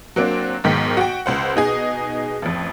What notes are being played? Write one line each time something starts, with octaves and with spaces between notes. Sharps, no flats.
F#3 A#3 C4 D4
B1 G#2 D#3 G5 B6
F#4 G5
C#2 C5 F#5
B2 D#4 G#4
A1 F2